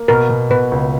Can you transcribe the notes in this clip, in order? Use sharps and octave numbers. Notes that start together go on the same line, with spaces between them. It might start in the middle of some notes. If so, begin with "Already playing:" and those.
Already playing: A#3
B2 A#4
B2
B2 B4
C#2